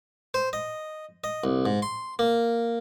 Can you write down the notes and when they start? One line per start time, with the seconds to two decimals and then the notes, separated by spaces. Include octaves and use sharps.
0.34 C5
0.53 D#5
1.24 D#5
1.44 C2
1.66 G#2
1.82 C6
2.19 A#3